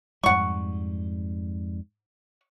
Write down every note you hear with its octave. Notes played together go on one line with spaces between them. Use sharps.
F2 G#2 G3 F#5 C#6